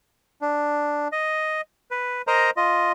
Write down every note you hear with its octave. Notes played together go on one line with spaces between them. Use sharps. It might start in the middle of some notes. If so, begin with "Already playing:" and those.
D4
D#5
B4
A#4 C5 D#5 A#5
F4 D#5